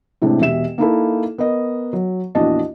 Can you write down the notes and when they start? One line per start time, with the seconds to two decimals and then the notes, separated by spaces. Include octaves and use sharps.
0.22 A2 C3 G#3 D4
0.39 E1 B2 G4 E5 E7
0.78 A#3 D#4 E4 A4
1.38 B3 A#4 D#5
1.93 F#3
2.35 A#1 E2 D4 F#4 D#5 A5